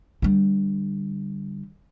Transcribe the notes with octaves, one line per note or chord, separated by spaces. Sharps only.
D3 G3